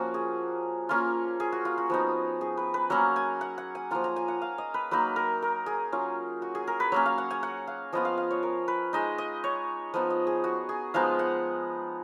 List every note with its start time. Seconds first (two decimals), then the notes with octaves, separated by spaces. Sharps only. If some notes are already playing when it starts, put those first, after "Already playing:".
Already playing: F3 A#3 C#4 F#4
0.14 G#4
0.89 A#3 C#4 F4
1.40 G#4
1.52 F#4
1.65 F4
1.78 F#4
1.90 F3 B3 D#4
2.41 G#4
2.57 B4
2.74 B4
2.90 F#3 A#3 C#4 F#5
3.16 G#5
3.41 F#5
3.58 F#5
3.75 G#5
3.91 F3 A#3 F4 A#5
4.04 A#5
4.16 G#5
4.28 F#5
4.42 F5
4.58 D#5
4.74 B4
4.91 F#3 A#3 D#4 B4
5.16 A#4
5.42 A#4
5.66 G#4
5.92 F#3 C#4 F4
6.42 F#4
6.55 G#4
6.67 A#4
6.80 B4
6.92 F#3 A#3 C#4 C#5
7.06 F5
7.18 F#5
7.31 G#5
7.43 F#5
7.67 F5
7.93 F3 B3 F4 D#5
8.05 F5
8.17 F5
8.31 C#5
8.43 A#4
8.68 B4
8.93 G#3 D#4 D#5
9.18 D#5
9.44 C#5
9.94 F3 B3 D#4 D#5
10.10 D#5
10.27 G#4
10.44 F#4
10.69 G#4
10.94 F3 G#3 B3 D#4 F5
11.19 F#5